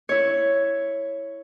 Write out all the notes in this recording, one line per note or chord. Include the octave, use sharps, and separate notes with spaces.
E4 C#5